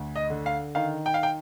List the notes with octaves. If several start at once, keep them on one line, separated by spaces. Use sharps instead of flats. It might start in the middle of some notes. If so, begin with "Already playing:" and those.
Already playing: D2 D3
D#5
D3
F5
D#3 F5
G5
F5
G5